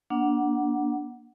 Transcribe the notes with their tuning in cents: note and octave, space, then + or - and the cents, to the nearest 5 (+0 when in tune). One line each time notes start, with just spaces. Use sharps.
A#3 +30 D4 +0 F#5 +0